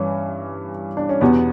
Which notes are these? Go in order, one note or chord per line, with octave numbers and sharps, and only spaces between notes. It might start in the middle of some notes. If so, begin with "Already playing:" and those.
Already playing: G2 E3 C#4
D4
C#4
E2 B2 G3 B3